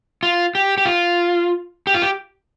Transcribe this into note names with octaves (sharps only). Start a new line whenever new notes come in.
F4
G4
G4
F4
G4
F4
G4